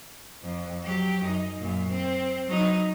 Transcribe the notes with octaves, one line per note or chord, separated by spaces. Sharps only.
F2
F#3 G4
F#2 D#4
F#2 A#2
C4
F#3 D#4